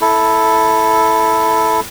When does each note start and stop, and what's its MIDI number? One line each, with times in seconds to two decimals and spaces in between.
0.01 1.80 64
0.01 1.80 69